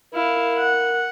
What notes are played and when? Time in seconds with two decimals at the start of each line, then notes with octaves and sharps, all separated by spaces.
0.14 E4 A#4 F5
0.58 F#5